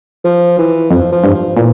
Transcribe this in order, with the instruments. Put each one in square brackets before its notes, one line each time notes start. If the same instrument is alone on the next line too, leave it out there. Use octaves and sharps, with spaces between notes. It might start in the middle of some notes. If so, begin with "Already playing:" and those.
[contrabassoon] F3
E3
[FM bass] F2 [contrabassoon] F3
[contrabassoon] F3
[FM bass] G2
[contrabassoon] F3
[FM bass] A#2 [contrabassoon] E3